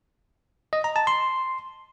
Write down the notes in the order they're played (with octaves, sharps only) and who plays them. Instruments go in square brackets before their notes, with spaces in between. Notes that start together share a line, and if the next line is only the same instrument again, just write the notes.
[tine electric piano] D#5
A#5
A5
C6